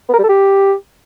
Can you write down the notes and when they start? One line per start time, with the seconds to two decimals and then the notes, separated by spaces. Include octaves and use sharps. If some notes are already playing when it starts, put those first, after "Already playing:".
0.09 B3
0.14 A#4
0.19 G3
0.24 A4
0.29 G4